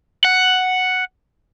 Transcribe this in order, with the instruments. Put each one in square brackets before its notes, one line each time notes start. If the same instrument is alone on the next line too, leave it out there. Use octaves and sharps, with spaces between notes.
[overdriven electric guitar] F#5